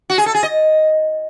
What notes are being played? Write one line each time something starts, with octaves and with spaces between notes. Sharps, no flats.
F#4
G#4
A4
G#4
D#5